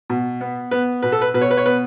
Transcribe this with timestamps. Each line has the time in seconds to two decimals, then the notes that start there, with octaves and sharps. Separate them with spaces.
0.10 B2
0.41 B3
0.71 B3 B4
1.02 B2 B4
1.12 A4
1.22 B4
1.34 B2 B4
1.42 C#5
1.51 B4
1.57 C#5
1.66 B3 B4